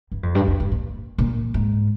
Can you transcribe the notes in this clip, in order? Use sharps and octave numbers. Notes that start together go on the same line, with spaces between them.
G2
F2
G2
F2
G2
A#2
A#2
G#2